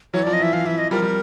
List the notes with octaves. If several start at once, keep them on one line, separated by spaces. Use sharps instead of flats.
E3 F#3 C#5
F3 D5
D#5
E3
E5
E3 F5
E3 E5
D#5
F3 G3 A#4
G3